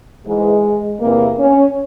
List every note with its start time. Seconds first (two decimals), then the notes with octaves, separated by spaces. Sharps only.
0.26 G#2 E3 G#3
1.00 E2 C3 E3 A#3
1.38 C#4